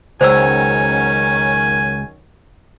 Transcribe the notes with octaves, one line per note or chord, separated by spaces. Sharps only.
C#2 D#3 F#3 C#4 C5 D5 G#5 E6